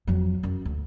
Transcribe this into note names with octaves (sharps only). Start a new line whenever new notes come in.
F2 F#3
F#2
D2